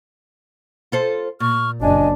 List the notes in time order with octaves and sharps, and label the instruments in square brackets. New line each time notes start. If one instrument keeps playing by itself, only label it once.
[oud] F4 A4 C5
[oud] A#2 [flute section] C#6 F6
[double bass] F#1 D4 [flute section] D#5 G#5